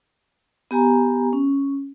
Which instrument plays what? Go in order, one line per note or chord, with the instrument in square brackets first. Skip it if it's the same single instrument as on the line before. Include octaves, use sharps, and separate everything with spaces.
[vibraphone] B3 G4 G#5 A#5
C#4